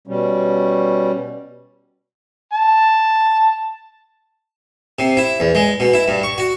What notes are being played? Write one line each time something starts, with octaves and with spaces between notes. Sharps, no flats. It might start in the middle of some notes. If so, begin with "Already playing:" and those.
B2 G3 C#4
A5
C3
E4
E2
G#3
B2
E4
G2
C#6
F#4